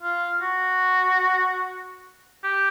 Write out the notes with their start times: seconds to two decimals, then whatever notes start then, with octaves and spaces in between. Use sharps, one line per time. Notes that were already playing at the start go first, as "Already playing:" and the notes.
0.02 F4
0.42 F#4
2.44 G4